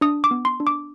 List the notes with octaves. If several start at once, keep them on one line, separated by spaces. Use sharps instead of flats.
D4 D#6
D6
B3
C6
D4
D6